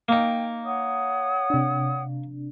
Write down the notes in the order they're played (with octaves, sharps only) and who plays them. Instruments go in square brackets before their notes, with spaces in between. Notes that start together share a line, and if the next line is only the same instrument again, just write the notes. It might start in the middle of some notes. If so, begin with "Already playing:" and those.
[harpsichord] A#3 D#4 [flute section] G5
[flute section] C#5 F#5 D#6
[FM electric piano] C3 D4